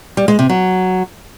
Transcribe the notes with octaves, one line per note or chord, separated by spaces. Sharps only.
G3
G#3
C3
F#3